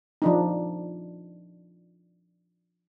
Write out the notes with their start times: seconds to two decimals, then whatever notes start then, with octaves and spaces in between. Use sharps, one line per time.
0.22 F3 D4 D#4